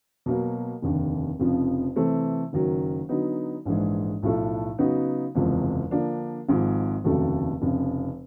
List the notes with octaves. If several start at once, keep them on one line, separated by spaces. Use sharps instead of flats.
B2 F#3 A#3
F1 D#2 D3
F1 F2 C#3 F3
C3 E3 A3 C4
F#1 F#2 D#3 F#3
D3 F#3 B3 D#4
A#1 G#2 E3 G#3
B1 A2 F3 A3
C#3 F#3 B3 D#4 F#4
F#1 E2 C3 F3 G#3
D3 F3 A#3 D4
G#1 G#2 F3
F1 D#2 C#3 F#3 A3
F1 F2 C#3